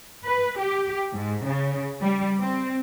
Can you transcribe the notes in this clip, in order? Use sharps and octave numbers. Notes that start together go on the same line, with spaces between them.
B4
G4
G#2
C#3
G3
C4